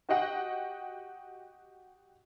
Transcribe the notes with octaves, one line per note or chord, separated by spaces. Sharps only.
F#4 G4 D#5 F#5 G5